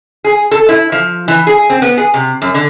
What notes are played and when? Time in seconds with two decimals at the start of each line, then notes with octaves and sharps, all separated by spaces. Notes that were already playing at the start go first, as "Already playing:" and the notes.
0.24 G#4
0.51 A4
0.69 E4
0.92 F3
1.28 E3
1.47 G#4
1.70 C4
1.82 B3
1.97 G#4
2.14 C3
2.42 F#2
2.54 D3